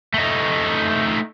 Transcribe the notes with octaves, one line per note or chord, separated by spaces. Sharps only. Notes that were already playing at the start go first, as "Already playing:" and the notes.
A3 D#4